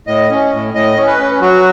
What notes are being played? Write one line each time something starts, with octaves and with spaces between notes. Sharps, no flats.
A2 D#5
C#4
A2
A2 D#5
C#4
B4
C#4
F#3 F#4